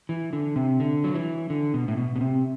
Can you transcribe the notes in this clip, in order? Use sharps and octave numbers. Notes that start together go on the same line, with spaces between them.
E3
D3
C3
D3
F#3
E3
D3
B2
A2
B2
B2
C3